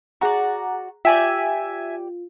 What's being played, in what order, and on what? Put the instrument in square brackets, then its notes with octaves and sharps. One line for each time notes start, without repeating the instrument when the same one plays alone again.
[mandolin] F#4 D5 [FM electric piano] G#4 F#5 A#5
[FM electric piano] F4 [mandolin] G4 D5 [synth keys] E5 G#5